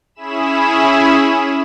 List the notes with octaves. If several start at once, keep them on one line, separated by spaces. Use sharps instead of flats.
C#4 E4 G#4 B5 E7